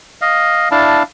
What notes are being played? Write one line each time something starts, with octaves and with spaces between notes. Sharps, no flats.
D#5 F5
D4 E4 F5 A5